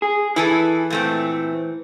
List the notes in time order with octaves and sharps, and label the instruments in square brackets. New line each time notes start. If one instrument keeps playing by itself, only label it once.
[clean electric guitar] G#4
[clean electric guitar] E3 [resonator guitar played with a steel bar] E4 G#4 A4
[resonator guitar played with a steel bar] A#2 A3 C4